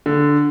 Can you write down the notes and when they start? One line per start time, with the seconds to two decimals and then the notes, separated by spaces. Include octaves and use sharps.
0.06 D3